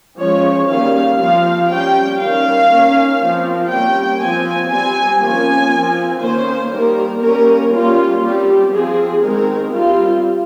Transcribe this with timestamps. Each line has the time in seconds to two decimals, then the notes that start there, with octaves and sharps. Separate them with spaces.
0.19 F3 G#3 C#4 C#5
0.69 D#3 G3 A#3 C#4 F5
1.19 F3 C4 F5
1.69 G3 C#4 G5
2.19 D#3 G3 C#4 F5
2.70 D#3 A#3 C#4
3.20 F3 C4
3.70 G3 A#3 C#4 G5
4.20 F3 C4 G#5
4.71 G3 C4 G#5
5.21 F3 A#3 C#4 G#5
5.71 F3 C4
6.21 D#3 A#3 C#4 C5
6.71 D#3 G3 A#3 A#4
7.22 G3 A#3 C#4 A#4
7.72 G3 A#3 C#4 F4
8.22 G3 C4 G4
8.72 F3 C4 G#4
9.22 D#3 G#3 C4 A#4
9.72 G3 C4 F4